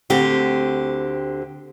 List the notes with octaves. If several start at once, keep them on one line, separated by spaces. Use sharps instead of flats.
D2 D3 C4 G4